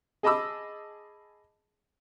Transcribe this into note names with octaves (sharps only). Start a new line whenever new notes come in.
G#4 D#5 A5 B5 D6 E6